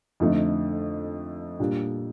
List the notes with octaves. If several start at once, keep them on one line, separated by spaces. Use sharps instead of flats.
F2 D3 A3 D#4
A#2 G3 D4